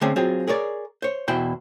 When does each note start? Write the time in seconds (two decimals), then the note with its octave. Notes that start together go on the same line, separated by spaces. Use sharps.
0.01 D3 A3 C4 C#4 G#4
0.16 F#3 C4 F4 G#4
0.47 G#4 A#4 C#5 D5
1.02 C5 C#5
1.28 E2 B2 E4 C5 G5